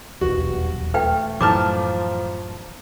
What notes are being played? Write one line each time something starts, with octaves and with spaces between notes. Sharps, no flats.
D#1 B1 E2 G2 F#4
A3 B4 G5
A1 F#2 A2 F3 F#3 A5 D6 F6